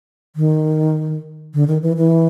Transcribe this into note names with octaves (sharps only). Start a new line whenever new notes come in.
D#3
D3
D#3
E3
E3